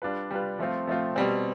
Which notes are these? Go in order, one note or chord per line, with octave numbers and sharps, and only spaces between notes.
G3 D4 F4 B4
G3 D4 F4 B4
F3 A3 C4 F4
F3 A3 C4 F4
B2 G3 C4